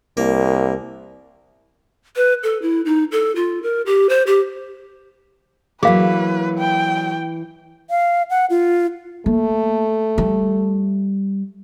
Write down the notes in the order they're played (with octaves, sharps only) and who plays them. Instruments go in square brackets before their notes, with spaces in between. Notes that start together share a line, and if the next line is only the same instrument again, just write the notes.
[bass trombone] C2 [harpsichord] A#3
[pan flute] B4
A4
E4
D#4
A4
F4
A#4
G4
C5
G4
[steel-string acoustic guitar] E3 [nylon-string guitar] F#3 A#3 [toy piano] G#4 F5 [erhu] B4
[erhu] G5
[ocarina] F5
F#5
F4
[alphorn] A3 [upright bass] A#3
[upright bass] G3